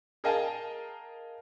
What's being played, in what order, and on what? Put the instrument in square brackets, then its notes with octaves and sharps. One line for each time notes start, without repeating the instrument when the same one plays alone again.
[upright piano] G#4 A#4 D#5 F5 G5 A5